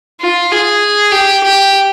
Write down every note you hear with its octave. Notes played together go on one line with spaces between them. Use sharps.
F4
G#4
G4
G4